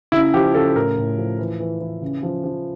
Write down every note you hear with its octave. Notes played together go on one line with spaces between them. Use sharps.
C#3 E4
F3 G4
C#3 A4
A2 A#4
A2
F3
E3
E3
E3
C#3
F3
F3